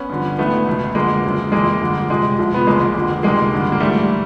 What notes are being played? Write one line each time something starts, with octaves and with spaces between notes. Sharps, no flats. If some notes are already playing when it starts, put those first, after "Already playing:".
Already playing: B3 C#4
G2 D3 F3
G#2 D#3 A3 B3
C#2 B2
F2 D3 F3 G#3 A#3
F#2 C#3 F3
F2 C#3 E3 G#3 A#3
G2 D3 F3
F2 C3 F3 G#3
C2 A#2 F3
B3
C#2 C#3 E3 G#3 A#3
F2 D3 F3
C#2 C3 D#3 G#3 A#3
G2 D3 F3
A#3
G#2 E3 G3 A3